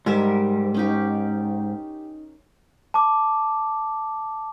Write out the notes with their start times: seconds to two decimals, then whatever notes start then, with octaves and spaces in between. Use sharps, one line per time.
0.06 G#2 G3 A#4 E5
0.74 C#4 D#4 G4
2.94 A5 D6